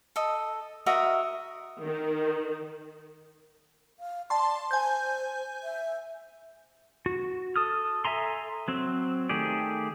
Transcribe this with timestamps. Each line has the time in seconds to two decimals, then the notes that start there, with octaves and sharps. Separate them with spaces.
0.16 A4 D#5
0.86 F#4 A#4 D#5 E5
1.83 D#3
4.00 F5
4.30 D5 A5 C6
4.71 C5 G#5 G6
5.64 E5
7.06 F#4
7.56 A4 D#6 F6
8.05 A4 E5 G#5 A#5 C6
8.68 F#3 C4
9.29 D#3 A3 G4 G#4 D5